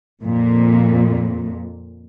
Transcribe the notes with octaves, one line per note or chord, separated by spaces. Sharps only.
F2 A#2